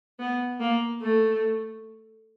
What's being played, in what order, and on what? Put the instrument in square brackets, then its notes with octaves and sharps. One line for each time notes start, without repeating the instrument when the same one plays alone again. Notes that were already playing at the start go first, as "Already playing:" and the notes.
[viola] B3
A#3
A3